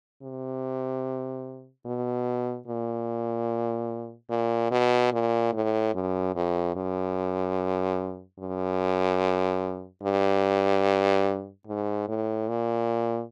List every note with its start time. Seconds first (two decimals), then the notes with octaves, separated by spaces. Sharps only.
0.22 C3
1.85 B2
2.67 A#2
4.30 A#2
4.71 B2
5.12 A#2
5.53 A2
5.94 F#2
6.35 F2
6.76 F#2
8.39 F#2
10.03 G2
11.67 G#2
12.08 A2
12.48 A#2